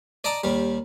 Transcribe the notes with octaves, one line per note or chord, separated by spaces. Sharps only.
D5 D#5 A5 A#5 D6
D#2 G3